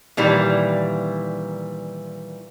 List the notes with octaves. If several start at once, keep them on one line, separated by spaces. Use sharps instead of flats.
A#2 D#3 E3 G3